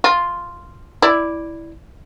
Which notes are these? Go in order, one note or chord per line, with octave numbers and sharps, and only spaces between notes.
F4
E4 D5